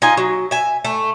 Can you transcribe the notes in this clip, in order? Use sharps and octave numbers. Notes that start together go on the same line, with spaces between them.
D#4 F4 D#5 G#5
F#3
E5 G#5
A3